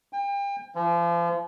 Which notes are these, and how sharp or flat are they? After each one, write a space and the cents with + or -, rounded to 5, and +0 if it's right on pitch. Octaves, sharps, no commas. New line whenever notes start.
G5 +35
F3 -35